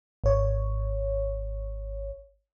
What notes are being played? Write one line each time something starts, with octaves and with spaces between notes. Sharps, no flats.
G#1 C#5